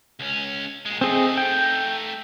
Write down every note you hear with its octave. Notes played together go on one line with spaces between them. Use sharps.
C#2 C#4
A#2 G#3
A3 C4 D#4 G#4 D#5
G5